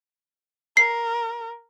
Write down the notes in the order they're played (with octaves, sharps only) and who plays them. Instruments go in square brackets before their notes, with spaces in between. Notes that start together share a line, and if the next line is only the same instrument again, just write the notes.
[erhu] A#4 [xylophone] C7